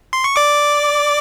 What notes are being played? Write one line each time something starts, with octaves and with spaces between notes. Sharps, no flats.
C6
C#6
D5 D6